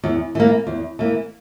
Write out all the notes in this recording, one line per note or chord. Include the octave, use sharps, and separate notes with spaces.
E2
E3 A#3
E2
E3 A#3